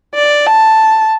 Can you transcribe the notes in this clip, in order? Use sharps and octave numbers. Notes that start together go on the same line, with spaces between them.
D5
A5